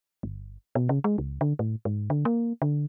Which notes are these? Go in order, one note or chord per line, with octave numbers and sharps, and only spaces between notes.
G1
B2
C#3
G#3
C#2
D3
A2
G#2
D3
A#3
D3